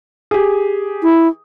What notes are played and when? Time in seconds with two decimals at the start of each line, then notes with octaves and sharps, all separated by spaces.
0.31 G4 G#4
1.03 E4